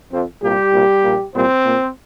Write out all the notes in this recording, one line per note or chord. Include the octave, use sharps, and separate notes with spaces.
F2 F3 C4
C2 A#2 G3 A#3 G4
C2 A#2 A#3
A#1 A#2 A#3
C2 A#2 G3 A#3 C4 C5
A#2 A#3